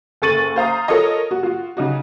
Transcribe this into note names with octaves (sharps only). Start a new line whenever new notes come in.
F#1 A4 C#6 A6 D#7 F#7
C5 F5 A#5 D#6
F4 A4 A#4 C#5 D#5
F#4
F4 F#4
C#3 D#4 F#4